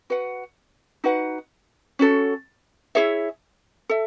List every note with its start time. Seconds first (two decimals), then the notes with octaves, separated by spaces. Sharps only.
0.10 F#4 B4 F#5
1.04 D#4 F#4 B4 F#5
1.99 C#4 F#4 A4
2.95 E4 G#4 C#5 E5
3.89 A4 E5